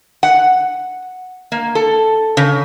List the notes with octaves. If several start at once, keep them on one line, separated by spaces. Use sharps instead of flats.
F#5
A#3
A4
C#3